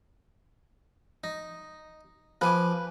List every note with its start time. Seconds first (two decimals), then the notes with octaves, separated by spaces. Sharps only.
1.24 D#4
2.41 F3 B4 G#5 D6